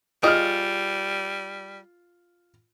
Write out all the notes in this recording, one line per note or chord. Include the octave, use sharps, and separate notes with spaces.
G3 F4 G#4 D#5 F6